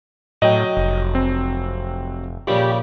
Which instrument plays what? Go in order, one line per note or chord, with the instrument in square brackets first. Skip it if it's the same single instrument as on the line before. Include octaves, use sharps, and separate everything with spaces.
[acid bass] A2 [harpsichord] F#3 [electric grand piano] D#5 G5
[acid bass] F1
[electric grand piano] C4
[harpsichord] A#1 C#3 G3 [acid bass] G4